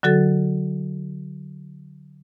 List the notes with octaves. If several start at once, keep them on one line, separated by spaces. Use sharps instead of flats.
D3 F#3 F#4 A4 A6